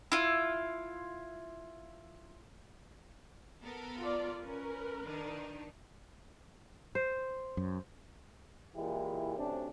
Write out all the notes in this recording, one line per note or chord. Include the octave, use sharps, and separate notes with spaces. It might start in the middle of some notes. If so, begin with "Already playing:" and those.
E4 F4
B3 A4 A#4
F4 D5
C#4 A#4 B4
D#3 D4 D#4
C5
F#2
A#2 E3 G#3 E4 G4
D2 C3 C#4 D4